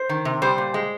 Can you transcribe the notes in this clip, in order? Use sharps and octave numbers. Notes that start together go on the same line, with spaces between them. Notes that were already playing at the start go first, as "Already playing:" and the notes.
Already playing: C5
D#3
C3
G3 C5
A#2
G#3